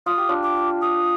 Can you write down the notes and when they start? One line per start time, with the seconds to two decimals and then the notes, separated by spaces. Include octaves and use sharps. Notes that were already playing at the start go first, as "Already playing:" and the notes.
0.06 F4 D#6
0.18 G4
0.29 D4 F4
0.43 D6
0.82 D#6